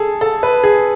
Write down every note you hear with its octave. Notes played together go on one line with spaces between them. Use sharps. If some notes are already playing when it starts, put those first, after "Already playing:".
Already playing: G#4 A4
A4
B4
G#4